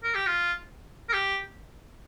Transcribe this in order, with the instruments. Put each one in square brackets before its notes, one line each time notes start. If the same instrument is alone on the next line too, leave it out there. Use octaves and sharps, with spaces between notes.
[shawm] A#4
G4
F4
A#4
G4